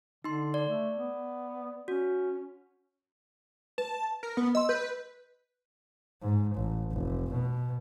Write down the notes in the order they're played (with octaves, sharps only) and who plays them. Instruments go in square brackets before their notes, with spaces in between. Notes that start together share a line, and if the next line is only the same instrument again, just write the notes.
[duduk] D3 [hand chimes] D#4 C6
[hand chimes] D5
[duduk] A3
B3
[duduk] C#4 [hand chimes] F#4
[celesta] B4 [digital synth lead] A5
[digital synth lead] A#4
B3
[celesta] D#5 C6 [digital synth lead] E6
[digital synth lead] B4 [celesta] G6
[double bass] G#2
A1
F1
B2